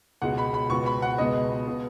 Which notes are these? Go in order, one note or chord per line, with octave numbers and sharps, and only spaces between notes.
C#2 B2 G#3 F#5
B5
B5
C#2 B2 B3 C#6
B5
F#5
C#2 B2 G#3 B3 D#5
B2 B3